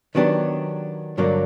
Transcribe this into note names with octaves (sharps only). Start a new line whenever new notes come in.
D#3 F#3 B3 D4 G4
G2 D3 F#3 A#3 D4